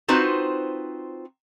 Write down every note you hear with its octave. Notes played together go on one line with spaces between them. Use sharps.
C4 D#4 F4 F#4 B4 C5